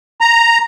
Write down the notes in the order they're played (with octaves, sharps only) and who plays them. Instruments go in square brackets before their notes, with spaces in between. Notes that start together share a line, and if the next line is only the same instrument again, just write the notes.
[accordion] A#5